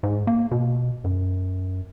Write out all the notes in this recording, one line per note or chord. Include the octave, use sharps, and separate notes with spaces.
G#2
A#3
B2
F#2